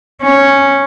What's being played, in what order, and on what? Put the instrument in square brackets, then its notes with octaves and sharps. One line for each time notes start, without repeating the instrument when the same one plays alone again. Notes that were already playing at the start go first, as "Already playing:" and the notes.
[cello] C#4